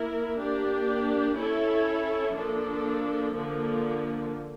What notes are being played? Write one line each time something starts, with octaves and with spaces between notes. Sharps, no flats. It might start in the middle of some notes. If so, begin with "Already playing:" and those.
Already playing: A#3 E4 A#4
A#3 D4 G4
C#4 E4 A4 C#5
F3 A#3 D4 A4
D3 F3 A#3